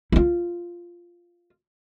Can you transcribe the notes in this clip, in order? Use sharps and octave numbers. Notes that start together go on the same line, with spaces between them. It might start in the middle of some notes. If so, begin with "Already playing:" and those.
E4 F4